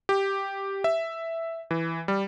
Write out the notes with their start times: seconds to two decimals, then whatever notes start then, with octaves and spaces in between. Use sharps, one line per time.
0.09 G4
0.84 E5
1.71 E3
2.08 G3